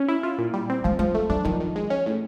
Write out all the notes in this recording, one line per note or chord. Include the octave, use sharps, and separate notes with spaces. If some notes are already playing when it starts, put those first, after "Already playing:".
Already playing: C#4
E4
F4
A#2
G3
C4
F3 G#3
F3 G#3
A3
G3 D4
D#3 F3
D#3
G#3
C#4
A2